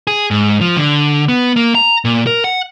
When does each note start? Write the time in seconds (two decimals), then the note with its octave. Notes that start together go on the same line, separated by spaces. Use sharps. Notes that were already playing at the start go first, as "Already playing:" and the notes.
0.07 G#4
0.31 G#2
0.61 F3
0.77 D3
1.29 B3
1.56 A#3
1.75 A#5
2.05 A#2
2.27 A#4
2.44 F#5